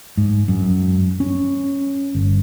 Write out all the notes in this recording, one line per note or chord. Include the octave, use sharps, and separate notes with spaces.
G#2
F#2
C#4
G1